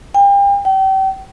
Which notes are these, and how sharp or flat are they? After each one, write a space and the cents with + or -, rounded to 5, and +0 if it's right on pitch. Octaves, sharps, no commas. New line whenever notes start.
G5 +35
G5 -35